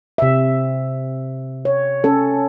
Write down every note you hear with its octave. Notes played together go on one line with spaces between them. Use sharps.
C3 E5
C#5
C#4 A4